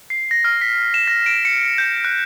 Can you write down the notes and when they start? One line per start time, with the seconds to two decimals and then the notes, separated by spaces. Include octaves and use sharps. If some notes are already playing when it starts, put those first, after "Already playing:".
0.10 C7
0.31 A#6
0.44 F6
0.61 B6
0.94 E7
1.08 A#6
1.26 D7
1.45 C#7
1.78 G6
2.04 F#6